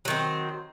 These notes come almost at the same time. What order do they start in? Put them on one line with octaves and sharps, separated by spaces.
F#3 D#3 C4